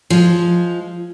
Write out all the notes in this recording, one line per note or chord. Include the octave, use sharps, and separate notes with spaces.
F3 G#3